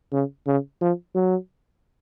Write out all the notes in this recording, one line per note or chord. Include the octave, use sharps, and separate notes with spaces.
C#3
C#3
F3
F#3